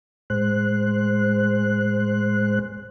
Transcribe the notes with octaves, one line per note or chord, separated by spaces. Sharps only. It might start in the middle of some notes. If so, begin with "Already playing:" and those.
A2 G#3 C5 F#6